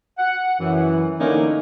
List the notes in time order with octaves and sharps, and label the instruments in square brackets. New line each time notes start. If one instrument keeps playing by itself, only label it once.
[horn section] F#5
F#2 E3
D3 E3 A3 A#3 C#4 D#4